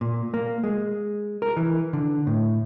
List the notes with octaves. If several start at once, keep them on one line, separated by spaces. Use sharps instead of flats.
A#2
A#3
G#3
A#4
E3
D3
A2